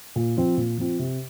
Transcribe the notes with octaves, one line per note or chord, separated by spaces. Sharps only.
A#2
F3 C4 F4
A#2
F3 C4 F4
C3